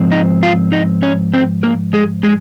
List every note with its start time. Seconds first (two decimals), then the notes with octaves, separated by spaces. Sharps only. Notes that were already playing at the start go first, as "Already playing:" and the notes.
Already playing: G#2 F3 C4
0.11 D#4 D#5
0.43 F4 F5
0.72 D#4 D#5
1.02 C#4 C#5
1.34 C4 C5
1.63 A#3 A#4
1.93 G#3 G#4
2.23 G#3 G#4